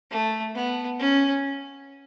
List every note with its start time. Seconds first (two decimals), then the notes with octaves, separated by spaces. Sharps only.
0.11 A3
0.55 B3
0.99 C#4